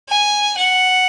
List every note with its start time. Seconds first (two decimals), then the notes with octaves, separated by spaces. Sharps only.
0.09 G#5
0.57 F#5